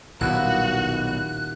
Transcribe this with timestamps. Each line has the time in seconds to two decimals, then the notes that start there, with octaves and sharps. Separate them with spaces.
0.21 D#1 B1 E4 F#4 F#6